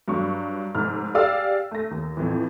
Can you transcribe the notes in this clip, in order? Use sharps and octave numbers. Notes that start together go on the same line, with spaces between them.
G2 F#3 C#6
F1 G#2 F6
G4 G#4 D5 F5 E6
A3 A#6
D#2
F2 A2 E3